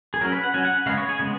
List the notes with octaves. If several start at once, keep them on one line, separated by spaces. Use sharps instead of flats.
G#4
F#3 C#4 A#4
B4
F#5
F#3 C#4 G#5
F#5
C#3 G#3 B3 F5
C#5
G#4
C#3 G#3 B3